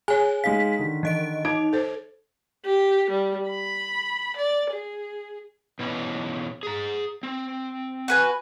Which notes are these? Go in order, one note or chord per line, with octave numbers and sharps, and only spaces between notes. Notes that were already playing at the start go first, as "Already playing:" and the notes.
G#4 C#5 G#5
G#3 D#4 F5 B6
D3 D#3
E3 D#5 D7
D#4 D#6 G#6 D7
A4 C5
G4
G3
B5
D5
G#4
B2 E3 C#4
G#4 A#5
C4
F#4 B4 G#5